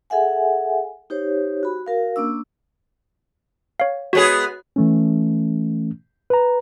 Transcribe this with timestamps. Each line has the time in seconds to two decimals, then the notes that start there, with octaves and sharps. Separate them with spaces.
0.10 G#4 A4 E5 F#5 G#5
1.10 D#4 G4 C5 C#5
1.63 F#4 B5
1.87 F#4 A#4 F5
2.16 A#3 C#4 D4 E6
3.80 C#5 F5
4.13 G#3 B3 F#4 G#4 C#5
4.76 E3 A3 C#4
6.30 B4 A#5